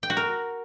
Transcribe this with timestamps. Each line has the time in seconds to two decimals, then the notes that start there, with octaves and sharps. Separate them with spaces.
0.03 G5
0.10 F#4
0.17 A#4